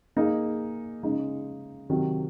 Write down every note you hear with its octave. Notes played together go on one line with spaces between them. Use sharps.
A#3 D#4 G#4
C#3 G#3 D#4
C3 D#3 F#3